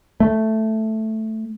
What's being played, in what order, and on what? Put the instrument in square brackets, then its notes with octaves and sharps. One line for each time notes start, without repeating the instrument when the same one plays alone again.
[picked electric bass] A3